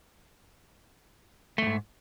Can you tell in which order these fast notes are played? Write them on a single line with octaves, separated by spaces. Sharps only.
A3 E2 G#2